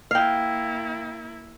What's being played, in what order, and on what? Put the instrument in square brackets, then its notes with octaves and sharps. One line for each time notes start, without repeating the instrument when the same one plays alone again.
[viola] A#3 E4 [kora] F5 G5